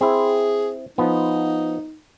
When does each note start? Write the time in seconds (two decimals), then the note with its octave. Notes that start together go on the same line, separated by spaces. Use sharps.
0.01 C4 E4 G#4
0.98 F3 B3 D#4